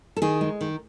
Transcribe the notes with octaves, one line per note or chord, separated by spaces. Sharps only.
A4
D#3 G#4
G#3
D#3